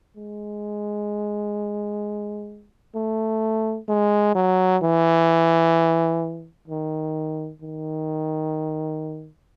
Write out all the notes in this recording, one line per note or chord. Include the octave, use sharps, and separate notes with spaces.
G#3
A3
G#3
F#3
E3
D#3
D#3